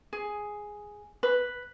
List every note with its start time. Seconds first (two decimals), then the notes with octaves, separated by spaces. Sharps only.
0.13 G#4
1.23 B4